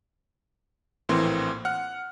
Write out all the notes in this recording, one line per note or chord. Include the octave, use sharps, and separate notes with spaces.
A#1 A2 E3 A#3 C4 C6
F#5 F6